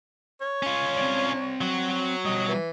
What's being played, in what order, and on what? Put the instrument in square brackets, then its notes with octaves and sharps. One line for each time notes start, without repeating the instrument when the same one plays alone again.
[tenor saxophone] C#5
[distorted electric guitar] C#4 F4
[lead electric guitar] C4 D5
[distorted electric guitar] F#3 F#4
[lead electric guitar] B2 G3 [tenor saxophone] D#5
[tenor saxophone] E3